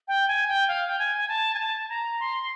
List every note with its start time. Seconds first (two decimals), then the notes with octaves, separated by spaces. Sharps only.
0.08 G5
0.28 G#5
0.48 G5
0.68 F5
0.87 G5
0.99 G#5
1.18 G#5
1.28 A5
1.55 G#5
1.59 A5
1.89 A#5
2.20 C6